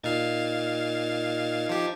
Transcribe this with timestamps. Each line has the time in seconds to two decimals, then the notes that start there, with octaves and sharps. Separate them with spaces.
0.04 A#2 D#4 F5 G#6 A6
1.69 F3 G4